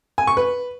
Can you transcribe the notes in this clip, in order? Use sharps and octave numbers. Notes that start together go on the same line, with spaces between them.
G#5
C#6
B4